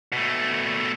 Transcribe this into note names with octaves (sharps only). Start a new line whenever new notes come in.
B2 A3